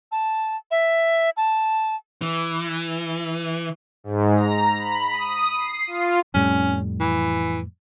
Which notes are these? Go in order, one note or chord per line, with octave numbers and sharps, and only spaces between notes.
A5
E5
A5
E3
G#2
A#5
B5
D#6
C7
F4
F2 A2 G3 C#4
E3